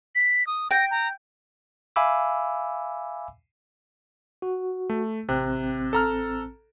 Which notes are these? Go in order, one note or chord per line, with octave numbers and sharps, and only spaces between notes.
B6
D#6
G5 A#6
A#5
E5 F5 G#5 B5 D6 E6
F#4
A3
A1 C3 C4 F#6
A4 A#5 F6